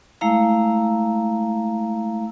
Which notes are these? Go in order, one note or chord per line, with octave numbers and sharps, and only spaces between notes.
G#3 A3 E4 F5 A#5 E6